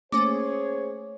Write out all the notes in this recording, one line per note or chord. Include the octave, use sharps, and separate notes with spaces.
A3 A#3 C#4 G#4 C5 C#5 D6